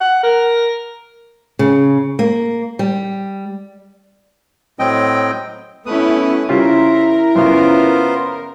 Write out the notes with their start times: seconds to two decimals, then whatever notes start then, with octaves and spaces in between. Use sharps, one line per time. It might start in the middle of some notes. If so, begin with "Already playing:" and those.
0.01 F#5
0.24 A#4
1.59 C#3
2.19 A#3
2.79 G3
4.79 A2 F#3 C4 D#5 G5
5.86 A3 B3 C#4 E4 B4 D#6
6.49 C#3 G3 E4 F4 A#4 C5 E5
7.35 F#2 C#3 B3 F4 C5